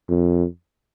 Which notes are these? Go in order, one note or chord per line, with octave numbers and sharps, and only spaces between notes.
F2